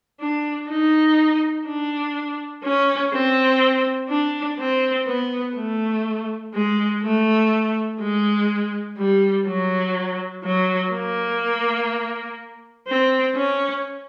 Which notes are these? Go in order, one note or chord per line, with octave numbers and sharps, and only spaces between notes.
D4
D#4
D4
C#4
C4
D4
C4
B3
A3
G#3
A3
G#3
G3
F#3
F#3
A#3
C4
C#4